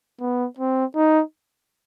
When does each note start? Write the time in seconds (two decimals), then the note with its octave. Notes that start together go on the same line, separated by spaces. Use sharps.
0.20 B3
0.59 C4
0.95 D#4